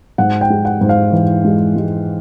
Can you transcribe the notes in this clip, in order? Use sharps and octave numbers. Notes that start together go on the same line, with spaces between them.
G#2 F#5
G5
G#3
F#5
G#2
F5
E3
G#3
G#3